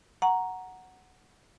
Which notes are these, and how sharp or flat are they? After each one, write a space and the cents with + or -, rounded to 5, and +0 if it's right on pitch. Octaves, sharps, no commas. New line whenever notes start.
F#5 +0 A#5 +0 C#6 +0